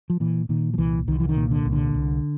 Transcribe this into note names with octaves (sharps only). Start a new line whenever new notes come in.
F3
A#2 E3
A#2 D#3
F3
C2 E3
C2 D#3
E3
D#3
A#2
D3
C2
D3
C2